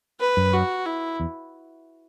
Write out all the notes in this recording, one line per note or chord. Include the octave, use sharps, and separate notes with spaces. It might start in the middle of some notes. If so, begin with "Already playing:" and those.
B4
F#2
F#4
E4
E2